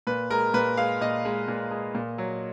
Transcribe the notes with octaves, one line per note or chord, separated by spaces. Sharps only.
A#2 B4
G#3 A#4
A#2 B4
G#3 F5
A#2 D#5
G#3
A#2
G#3
A#2
F#3